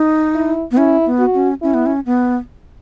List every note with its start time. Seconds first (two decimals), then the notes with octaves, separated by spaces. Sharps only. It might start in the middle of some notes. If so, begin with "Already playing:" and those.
Already playing: D#4
0.35 E4
0.71 B3
0.77 C#4 E4
1.06 B3
1.19 F#4
1.34 C#4
1.62 C#4 E4
1.74 B3
1.86 C#4
2.06 B3